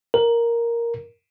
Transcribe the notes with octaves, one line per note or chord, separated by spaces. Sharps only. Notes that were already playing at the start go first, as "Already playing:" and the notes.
A#4